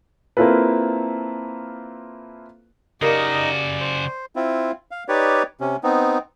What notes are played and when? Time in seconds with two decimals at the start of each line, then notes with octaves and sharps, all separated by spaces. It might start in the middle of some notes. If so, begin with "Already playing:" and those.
0.37 A#3 C4 E4 F4 A4 B4
3.02 C#3 D#4 F#4 G4 A#4 D5 D#5 F5
3.81 C5
4.36 C4 E4 F4
4.91 F5
5.08 D#4 G4 B4 C#5 D5
5.61 C3 C#4
5.84 B3 C4 D#4